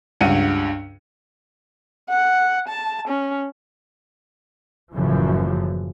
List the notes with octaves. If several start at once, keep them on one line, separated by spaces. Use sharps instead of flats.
C#2 G2 F#5 C#7 D#7
F#5
A5
C#4
F#1 F#2 A2 C#3 E3 F3